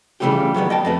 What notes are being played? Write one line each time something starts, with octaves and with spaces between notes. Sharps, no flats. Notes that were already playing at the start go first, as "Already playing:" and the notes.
C#3 E3 G3 A3 F4 G4
D#3 F#3 G3 B3
D#5 G5 A5
F2 A3 B4